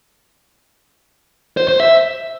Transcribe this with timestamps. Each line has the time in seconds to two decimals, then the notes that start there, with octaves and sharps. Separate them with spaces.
1.57 C5
1.68 C5
1.80 E5